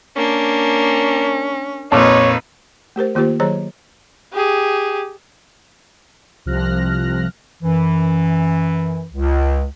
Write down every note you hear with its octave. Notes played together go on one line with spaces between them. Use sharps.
A#3 C#4 D4
F2 A#2 D#4 B4 C#5
A3 G4 A#4 C5
D#3 A#3 F4 G4 C5
D#3 F#3 G#4 C5 C#5 A#5
G4 G#4
C2 C3 F3 F6 F#6 A#6
F#2 E3
C#2